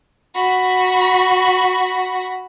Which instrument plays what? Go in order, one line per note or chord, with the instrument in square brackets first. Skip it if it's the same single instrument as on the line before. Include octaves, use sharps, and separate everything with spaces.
[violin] F#4 B5